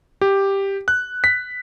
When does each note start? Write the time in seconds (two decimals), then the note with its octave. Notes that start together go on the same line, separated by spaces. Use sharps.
0.21 G4
0.88 F#6
1.24 B6